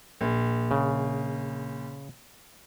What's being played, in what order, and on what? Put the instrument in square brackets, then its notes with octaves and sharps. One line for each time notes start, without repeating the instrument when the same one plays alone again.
[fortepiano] A#1
[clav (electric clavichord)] C#3